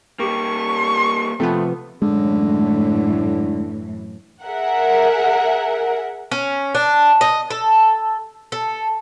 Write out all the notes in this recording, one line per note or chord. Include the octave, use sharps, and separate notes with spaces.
G3 A#3 G4 C#6
C3 F3 A3 B3
F#2 A2 D3 E3 G#3
G#4 A#4 E5 F#5
C#4
D4
D#5
A4
A4